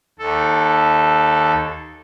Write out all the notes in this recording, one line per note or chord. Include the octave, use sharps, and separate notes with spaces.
D#2 A4